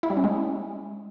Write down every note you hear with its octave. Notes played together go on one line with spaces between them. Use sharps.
E4
G3
C#4
G#3